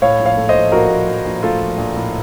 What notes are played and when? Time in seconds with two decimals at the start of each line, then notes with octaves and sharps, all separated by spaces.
0.02 A2 C#5 F5
0.19 A#1
0.25 C#5 F5
0.37 A3
0.49 C5 D#5
0.55 A#1
0.72 A#1 F#4 A#4
0.90 A#1
1.07 A#1
1.25 A#1
1.43 A3 F4 A4
1.61 A#1
1.78 A#1
1.95 A2